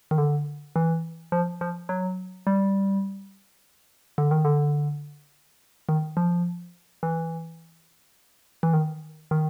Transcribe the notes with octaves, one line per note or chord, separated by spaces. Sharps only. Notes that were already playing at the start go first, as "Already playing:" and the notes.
D#3
D3
E3
F3
F3
F#3
G3
D3
D#3
D3
D#3
F3
E3
E3
D#3
D#3